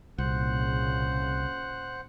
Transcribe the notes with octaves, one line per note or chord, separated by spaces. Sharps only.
C2 A#2 C#3 C5 F#5 F#6